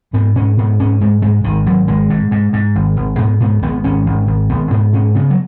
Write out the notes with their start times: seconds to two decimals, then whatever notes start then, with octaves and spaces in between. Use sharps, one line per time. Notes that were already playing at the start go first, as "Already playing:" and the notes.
0.13 G#2 B3
0.36 G#2 C#4
0.57 G#2 B3
0.79 G#2 C#4
1.01 G#2 G#3
1.22 G#2 G#3
1.44 G#1 D#3
1.66 G#1 F#3
1.88 G#1 G#3
2.10 G#2
2.31 G#2
2.53 G#2
2.75 G#1
2.97 G#1
3.18 G#2 B3
3.40 G#2 B3
3.62 G#1 B3
3.84 G#1 C#4
4.06 G#1
4.27 G#1
4.50 G#1 B3
4.71 G#2 B3
4.93 G#2 C#4
5.15 C#3 B3
5.30 F#3